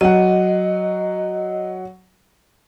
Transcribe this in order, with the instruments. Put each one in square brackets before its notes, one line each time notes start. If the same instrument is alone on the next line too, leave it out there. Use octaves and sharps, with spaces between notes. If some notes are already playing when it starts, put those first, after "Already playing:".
[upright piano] F#3 F#5 [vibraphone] D#5